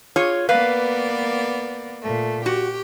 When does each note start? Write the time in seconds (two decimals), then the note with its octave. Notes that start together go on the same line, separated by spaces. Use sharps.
0.16 F4 G#4 C#5
0.49 A#3 B3 B4 D5 F5
2.03 A#2 A3
2.46 F#4 G4